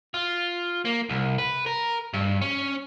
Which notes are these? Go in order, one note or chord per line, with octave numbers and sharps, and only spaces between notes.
F4
A#3
C2
B4
A#4
G2
C#4